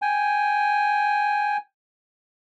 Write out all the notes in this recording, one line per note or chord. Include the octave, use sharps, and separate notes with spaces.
G5 G#5